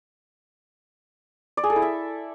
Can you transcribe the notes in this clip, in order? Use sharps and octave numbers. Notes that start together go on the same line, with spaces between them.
D5
G#4
A4
E4
E5